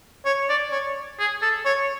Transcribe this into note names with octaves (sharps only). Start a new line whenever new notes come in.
C#5
D5
C#5
G#4
A4
C#5